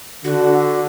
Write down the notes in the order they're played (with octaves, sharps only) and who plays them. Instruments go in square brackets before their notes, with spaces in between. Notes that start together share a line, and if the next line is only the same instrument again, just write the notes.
[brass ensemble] D3 [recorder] F#4